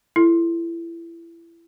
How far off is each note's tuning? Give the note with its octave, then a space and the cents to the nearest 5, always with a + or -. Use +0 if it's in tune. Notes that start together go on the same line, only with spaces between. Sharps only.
E4 +25 A4 +0